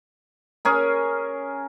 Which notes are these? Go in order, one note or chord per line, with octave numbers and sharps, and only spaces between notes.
C#4 G#4 A#4